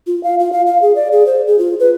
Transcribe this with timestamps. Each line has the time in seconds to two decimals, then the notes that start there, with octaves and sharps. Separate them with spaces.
0.07 F4
0.23 F5
0.39 F4
0.53 F5
0.67 F5
0.82 G#4
0.95 D5
1.12 G#4
1.26 C5
1.47 G#4
1.59 F4
1.79 B4